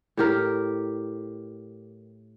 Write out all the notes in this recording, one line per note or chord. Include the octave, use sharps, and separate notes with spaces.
A2 G4 A#4